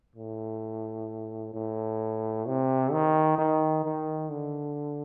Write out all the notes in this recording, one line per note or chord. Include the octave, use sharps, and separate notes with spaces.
A2
A2
C3
D#3
D#3
D#3
D3